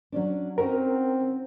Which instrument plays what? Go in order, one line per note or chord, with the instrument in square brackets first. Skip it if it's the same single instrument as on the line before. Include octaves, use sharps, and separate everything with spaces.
[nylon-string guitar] F#3 C#4 D4
[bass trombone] C4 [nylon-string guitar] C#4 D#4 F#4 [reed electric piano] A#4